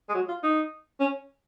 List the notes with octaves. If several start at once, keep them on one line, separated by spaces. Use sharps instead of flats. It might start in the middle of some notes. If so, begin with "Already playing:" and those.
G#3
F#3
F4
D#4
C#4